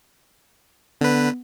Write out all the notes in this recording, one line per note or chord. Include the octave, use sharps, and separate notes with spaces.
D3 B3 B4